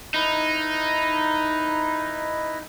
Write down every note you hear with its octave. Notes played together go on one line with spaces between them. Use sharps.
D#4 E4 B4 D#5